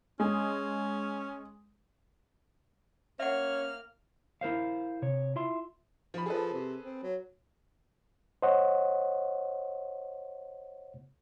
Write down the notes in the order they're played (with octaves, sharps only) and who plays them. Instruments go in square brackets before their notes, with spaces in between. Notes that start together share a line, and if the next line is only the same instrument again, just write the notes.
[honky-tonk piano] G#3 [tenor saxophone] C#4
[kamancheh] A#3 F6 [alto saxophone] C#4 [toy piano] E5 F#5
[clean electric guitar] E4 A#4 C5 F5
C3 C#5
E4 F4 E5 C6
[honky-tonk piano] F3 B5
[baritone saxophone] F3 [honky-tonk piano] G#4 A4 B4
[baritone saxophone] C3
C4
F#3
[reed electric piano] C5 C#5 D#5 F#5